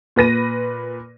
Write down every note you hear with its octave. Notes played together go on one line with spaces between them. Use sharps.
A#2 B4 A#6 D#7